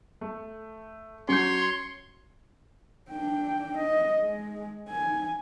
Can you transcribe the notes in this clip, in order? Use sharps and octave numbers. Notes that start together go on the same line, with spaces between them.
A3
F#3 C#4 C#5 C6 G6
D4 G5
D#5
G#3
G#5